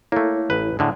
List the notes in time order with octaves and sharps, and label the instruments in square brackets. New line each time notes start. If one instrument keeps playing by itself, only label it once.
[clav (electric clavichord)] A3 A#3 [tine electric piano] E4 A4 C#5
[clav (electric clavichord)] A1 B4
A2 D3 G#3